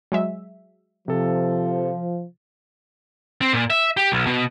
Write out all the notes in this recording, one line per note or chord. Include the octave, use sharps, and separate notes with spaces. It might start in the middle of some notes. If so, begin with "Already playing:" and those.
F#3 G#3 E5
C3 F3 A4
C4
A#2
E5
G4
B1
B2